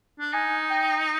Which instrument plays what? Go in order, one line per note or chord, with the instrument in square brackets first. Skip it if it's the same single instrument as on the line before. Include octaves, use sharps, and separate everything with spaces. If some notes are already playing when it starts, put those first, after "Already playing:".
[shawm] D4
[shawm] D#4 [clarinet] G#5
[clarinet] G5